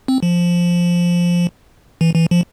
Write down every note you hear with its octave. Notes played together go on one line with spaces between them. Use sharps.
C4
F3
E3
E3
F3